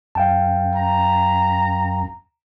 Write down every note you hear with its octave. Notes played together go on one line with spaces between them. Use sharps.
F#2 F5 G5 A5
A#5